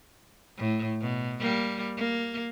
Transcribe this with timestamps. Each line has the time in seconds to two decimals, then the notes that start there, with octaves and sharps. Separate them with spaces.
0.58 A2
1.01 B2
1.40 G3 A#3
1.97 A#3